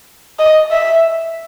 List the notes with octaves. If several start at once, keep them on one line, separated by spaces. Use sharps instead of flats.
D#5
E5